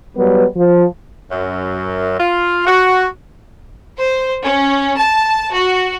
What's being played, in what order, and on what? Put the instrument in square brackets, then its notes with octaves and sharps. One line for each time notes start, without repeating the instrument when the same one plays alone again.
[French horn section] F#3 G3 B3 B4
F3
[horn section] F#2
F4
F#4
[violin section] C5
C#4
A5
F#4